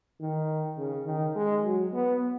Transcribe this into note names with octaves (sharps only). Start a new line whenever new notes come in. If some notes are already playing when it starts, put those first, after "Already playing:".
D#3
C#3
D#3
G#3
F#3
B3